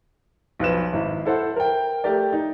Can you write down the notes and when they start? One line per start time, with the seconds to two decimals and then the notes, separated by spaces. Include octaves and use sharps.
0.60 B1 F3 B4 E7
0.93 G#1 E4
1.25 E4 A4 C5 F#5
1.56 A#4 G5
2.04 A3 G4 A#4 D5
2.32 D#4